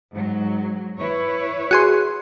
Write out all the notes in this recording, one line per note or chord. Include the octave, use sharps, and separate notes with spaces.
G#2 F#3
E4 B4 C#5
F#4 G#4 C6